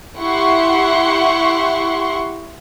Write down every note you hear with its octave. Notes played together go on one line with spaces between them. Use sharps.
E4 G4 F#5 C6 C#6